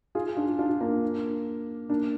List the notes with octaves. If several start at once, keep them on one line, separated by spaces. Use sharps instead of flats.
F4 G#4
D4 F4
D4 F4
A#3 D4
A#3 D4